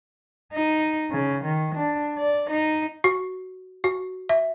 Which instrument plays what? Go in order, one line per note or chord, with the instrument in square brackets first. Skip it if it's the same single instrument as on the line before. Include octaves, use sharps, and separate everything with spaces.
[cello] D#4
C#3
D#3
D4
D5
D#4
[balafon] F#4
F#4
E5